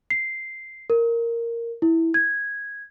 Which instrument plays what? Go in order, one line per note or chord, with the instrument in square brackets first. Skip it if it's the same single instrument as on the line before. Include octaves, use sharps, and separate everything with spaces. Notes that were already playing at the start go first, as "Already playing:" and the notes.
[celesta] C7
A#4
E4
G#6